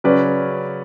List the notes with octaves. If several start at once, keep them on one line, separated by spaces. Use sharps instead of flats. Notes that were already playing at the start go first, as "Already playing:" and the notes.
C#3 F#3 C#4 B4 D5